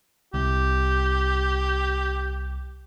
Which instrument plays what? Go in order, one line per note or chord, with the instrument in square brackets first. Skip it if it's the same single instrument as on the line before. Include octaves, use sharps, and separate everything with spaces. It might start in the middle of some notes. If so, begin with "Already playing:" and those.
[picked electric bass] C2 [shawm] G4